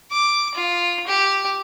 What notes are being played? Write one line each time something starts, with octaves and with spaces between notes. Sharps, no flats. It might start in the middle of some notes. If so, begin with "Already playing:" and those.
D6
F4
G4